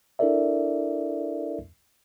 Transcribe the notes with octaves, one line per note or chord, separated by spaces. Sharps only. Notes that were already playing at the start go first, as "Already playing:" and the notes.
D4 E4 A4 A#4 D5 E5